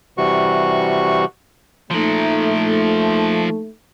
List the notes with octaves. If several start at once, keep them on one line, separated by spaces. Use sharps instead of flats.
C3 E3 G3 F#4 C#6
F3 A3 A#3 D#4 A#4